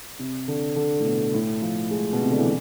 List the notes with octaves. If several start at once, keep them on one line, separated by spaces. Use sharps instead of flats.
C3
D3
D3
A2
B2
A2
F3
G#3
B2
C3
D3
E3